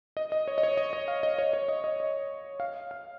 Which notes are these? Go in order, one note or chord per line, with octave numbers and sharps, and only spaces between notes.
D#5
D#5
C#5
D#5
C#5
D#5
D#5
F5
D#5
C#5
C#5
D#5
D#5
D#5
F5
F5